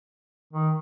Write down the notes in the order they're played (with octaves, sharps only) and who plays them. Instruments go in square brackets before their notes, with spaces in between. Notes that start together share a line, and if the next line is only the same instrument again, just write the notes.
[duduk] D#3